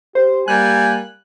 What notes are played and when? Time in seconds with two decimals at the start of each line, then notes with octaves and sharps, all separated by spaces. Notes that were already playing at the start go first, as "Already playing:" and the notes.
0.15 G4 C5
0.48 G3 A#3 G#5 F#6